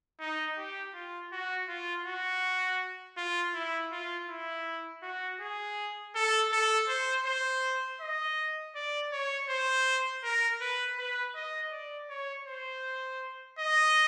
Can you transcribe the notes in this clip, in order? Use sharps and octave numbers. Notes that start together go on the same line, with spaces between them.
D#4
G4
F4
F#4
F4
F#4
F4
E4
F4
E4
F#4
G#4
A4
A4
C5
C5
D#5
D5
C#5
C5
A#4
B4
B4
D#5
D5
C#5
C5
D#5